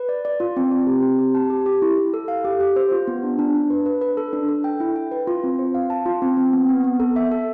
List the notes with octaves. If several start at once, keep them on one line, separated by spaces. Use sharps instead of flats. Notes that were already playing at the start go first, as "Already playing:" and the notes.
Already playing: B4
D5
D5
F4
C4
C4
G4
C4
G4
A5
G4
G4
E4
E4
A4
F5
G4
G4
C5
F4
B3
D4
D4
D4
B4
B4
B4
A4
D4
A4
G5
E4
G5
B4
F4
C4
C5
F5
A5
F4
C4
C4
B3
B3
B3
A4
E5
A4